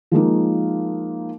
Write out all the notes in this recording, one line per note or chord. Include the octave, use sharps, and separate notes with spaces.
F3 G#3 A#3 D#4